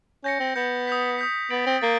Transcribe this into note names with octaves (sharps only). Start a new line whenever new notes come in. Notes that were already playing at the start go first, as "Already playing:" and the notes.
C#4 G6 A#6 C#7
C4
B3 G6 A#6 C#7
D#6 G6 B6
D#6 G6 B6
B3 A6 D7 F#7
C4
A#3 A6 D7